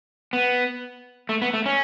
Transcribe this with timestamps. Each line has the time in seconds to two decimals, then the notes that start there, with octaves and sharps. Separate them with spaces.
0.33 B3
1.29 A3
1.42 B3
1.54 A3
1.66 C#4